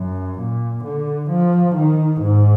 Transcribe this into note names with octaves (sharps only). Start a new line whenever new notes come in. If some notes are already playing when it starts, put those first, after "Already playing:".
Already playing: F#2
A#2
D3
F3
D#3
G#2